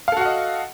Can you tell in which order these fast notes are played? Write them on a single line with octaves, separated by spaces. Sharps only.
F5 A4 F#4 F#5 D#5